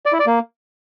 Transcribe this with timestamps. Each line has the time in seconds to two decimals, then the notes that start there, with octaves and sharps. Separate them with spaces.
0.06 D5
0.13 E4
0.20 D5
0.26 A#3